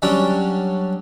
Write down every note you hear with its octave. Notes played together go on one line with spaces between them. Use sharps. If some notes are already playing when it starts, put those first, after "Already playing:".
F#3 G3 C#4 D4